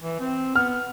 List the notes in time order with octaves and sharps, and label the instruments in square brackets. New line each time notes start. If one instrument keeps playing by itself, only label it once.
[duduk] E3
C4
[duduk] B3 [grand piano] F6